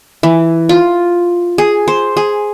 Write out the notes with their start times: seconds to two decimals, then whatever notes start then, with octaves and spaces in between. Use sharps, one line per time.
0.23 E3
0.69 F4
1.58 G#4
1.88 C5
2.17 G#4